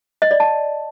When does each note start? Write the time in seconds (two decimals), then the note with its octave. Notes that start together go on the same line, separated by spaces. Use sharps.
0.22 D#5
0.31 D5
0.40 A5